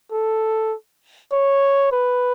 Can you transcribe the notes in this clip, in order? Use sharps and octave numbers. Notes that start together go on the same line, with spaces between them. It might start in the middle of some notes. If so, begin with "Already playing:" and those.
A4
C#5
B4